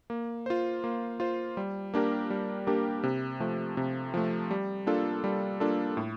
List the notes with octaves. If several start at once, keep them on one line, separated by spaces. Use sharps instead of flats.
A#3
F4 C5
A#3
F4 C5
G3
A#3 D4 G4 A#4
G3
A#3 D4 G4 A#4
C3
F3 A3
C3
F3 A3
G3
A#3 D4 F4 A4
G3
A#3 D4 F4 A4
A2